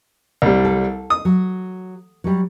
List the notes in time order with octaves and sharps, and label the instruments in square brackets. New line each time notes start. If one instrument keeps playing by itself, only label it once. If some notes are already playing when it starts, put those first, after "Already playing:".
[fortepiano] C2 G3
[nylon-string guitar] A4
[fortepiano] D#6
[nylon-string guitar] F#3
F#3 G3